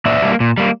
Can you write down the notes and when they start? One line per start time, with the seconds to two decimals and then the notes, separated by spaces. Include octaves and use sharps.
0.06 A#2 D5 E5
0.22 G3 A#3
0.40 A#2
0.58 G3 A#3